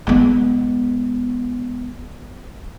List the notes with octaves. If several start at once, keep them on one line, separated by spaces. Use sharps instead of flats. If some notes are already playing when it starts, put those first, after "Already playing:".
G#3 B3